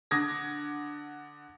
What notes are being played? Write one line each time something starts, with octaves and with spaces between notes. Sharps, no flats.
D3 D6 D#6 G#6 A#6